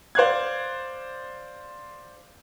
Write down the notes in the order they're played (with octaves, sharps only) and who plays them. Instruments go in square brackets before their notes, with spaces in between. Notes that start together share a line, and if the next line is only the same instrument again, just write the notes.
[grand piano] C5 D5 F5 F#6 G#6